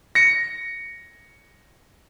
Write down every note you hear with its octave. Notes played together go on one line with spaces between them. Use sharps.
A#6 C#7